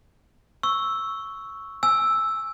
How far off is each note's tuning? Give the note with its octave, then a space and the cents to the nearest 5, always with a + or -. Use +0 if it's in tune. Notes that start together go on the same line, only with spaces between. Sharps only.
C#6 +0 E6 +0
G#5 -5 E6 +0